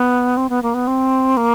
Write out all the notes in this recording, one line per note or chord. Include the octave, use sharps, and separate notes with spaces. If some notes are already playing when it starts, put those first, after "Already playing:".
Already playing: B3
C4
B3
A#3
B3
C4
A#3